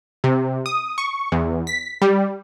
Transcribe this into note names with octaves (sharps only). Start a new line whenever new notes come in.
C3
D#6
C#6
E2
B6
G3